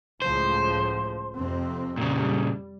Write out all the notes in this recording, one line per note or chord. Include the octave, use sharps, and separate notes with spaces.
C#2 A2 F3 C5
F2 C3 C4
A#2 C#3 G3